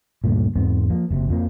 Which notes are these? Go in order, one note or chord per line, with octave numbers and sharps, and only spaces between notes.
D2 G2 A#2
E2 G#2 B3 C4
F3 A#3
F#1 C3
F2 F3 A#3